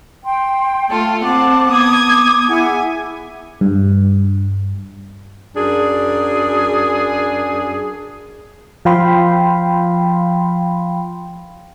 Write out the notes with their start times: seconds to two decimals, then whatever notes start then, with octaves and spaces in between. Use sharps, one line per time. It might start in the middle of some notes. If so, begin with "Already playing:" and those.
0.25 G5 C6
0.90 A3 F4 A4
1.22 C4 F#5 A5 D6
1.70 B3 D#6 G#6
2.49 E4 G#4 F#5 G#5
3.61 G2
5.55 F#2 D4 G#4
8.85 F3 F5 G5 B5 C6